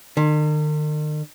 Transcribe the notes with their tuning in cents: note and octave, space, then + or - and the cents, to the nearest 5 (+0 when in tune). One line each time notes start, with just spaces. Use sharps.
D#3 -45